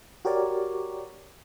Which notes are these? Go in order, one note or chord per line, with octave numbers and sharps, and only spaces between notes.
F#4 G4 A#4 C#5 D5